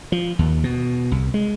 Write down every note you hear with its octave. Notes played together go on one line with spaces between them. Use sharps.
F3
D#2
B2
C2
G#3